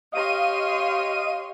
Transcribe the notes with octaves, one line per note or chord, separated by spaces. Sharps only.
G4 C#5 D#5 F5 C6 D#7